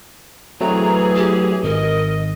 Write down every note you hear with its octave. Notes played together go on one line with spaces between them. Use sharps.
E3 F#3 A3 C4 G#4 A#5
G4
G#1 A#4 D#5